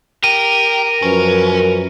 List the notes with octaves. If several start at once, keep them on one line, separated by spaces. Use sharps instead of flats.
G4 A#4 D#7
F#2 F3 C#4 B4